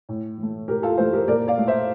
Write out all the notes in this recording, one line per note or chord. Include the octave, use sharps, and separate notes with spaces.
A2
E3 A3
A2 G4 A#4
F4 A4
E3 A3 A4 C5
G4 A#4
A#2 A#4 D5
D5 F5
A3
C5 E5